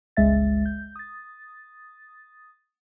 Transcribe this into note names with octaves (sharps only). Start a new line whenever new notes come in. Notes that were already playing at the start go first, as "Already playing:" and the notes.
G1 C#2 G#3 E5 A6
G6
D#6 A6